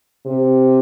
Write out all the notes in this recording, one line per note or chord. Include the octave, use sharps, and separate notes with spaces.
C3